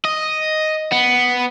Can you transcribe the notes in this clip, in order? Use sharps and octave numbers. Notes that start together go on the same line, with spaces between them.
D#5
B3